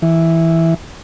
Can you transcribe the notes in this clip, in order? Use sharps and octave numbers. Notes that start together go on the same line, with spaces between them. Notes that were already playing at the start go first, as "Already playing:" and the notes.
E3